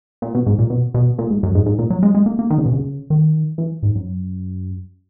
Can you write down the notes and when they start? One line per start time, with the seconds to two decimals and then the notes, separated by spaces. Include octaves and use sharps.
0.22 A#2
0.35 B2
0.47 G#2
0.59 A#2
0.70 B2
0.94 B2
1.19 A#2
1.30 G#2
1.43 F#2
1.55 G#2
1.66 G#2
1.79 A#2
1.90 F#3
2.03 G#3
2.15 G#3
2.26 A#3
2.39 A#3
2.50 D#3
2.58 C#3
2.66 B2
2.73 C#3
3.10 D#3
3.58 E3
3.83 G#2
3.95 F#2